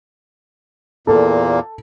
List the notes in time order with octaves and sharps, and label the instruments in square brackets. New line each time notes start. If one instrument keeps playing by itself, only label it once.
[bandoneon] E2 A#2 A#3 [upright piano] A4